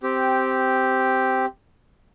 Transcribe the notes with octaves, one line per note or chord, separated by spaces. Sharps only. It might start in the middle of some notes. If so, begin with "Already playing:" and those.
C4 G4